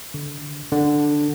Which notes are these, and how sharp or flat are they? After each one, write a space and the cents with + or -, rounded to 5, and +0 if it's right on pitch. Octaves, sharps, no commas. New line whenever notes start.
D3 -15
D3 +5